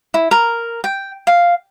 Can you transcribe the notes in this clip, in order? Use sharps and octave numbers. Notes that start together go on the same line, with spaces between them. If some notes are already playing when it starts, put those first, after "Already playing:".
E4
A#4
G5
F5